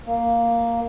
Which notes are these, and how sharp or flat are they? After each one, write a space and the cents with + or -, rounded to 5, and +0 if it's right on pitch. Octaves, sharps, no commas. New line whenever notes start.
A#3 +0